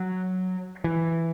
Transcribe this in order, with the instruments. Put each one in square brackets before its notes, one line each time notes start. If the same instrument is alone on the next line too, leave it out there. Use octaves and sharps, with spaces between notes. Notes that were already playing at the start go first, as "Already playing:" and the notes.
Already playing: [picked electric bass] F#3
E3